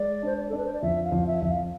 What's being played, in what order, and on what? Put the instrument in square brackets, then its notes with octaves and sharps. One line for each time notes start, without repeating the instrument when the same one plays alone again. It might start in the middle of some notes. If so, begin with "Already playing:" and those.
Already playing: [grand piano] G#3 [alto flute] D5
[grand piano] D4 [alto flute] C5
[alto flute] D5
A4
[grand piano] D4 [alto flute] B4
[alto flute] C5
D5
[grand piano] F2 [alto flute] E5
[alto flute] F5
[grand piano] F2
[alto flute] E5
[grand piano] F2 [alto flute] E5
[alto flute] F5